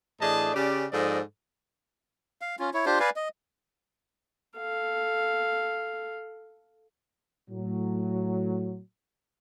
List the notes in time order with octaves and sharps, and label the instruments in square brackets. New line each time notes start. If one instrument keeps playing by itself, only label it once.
[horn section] A2 E3 D4 G#4 D#5 A5
C#3 C#4 G4 D5
G#2 F3 A4 C5 D5 D#5
[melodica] F5
C#4 F4
E4 C#5
D4 F4 G4 C5
B4 D5 F5 G#5
D#5
[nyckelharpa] A4 F5
[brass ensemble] A2 F#3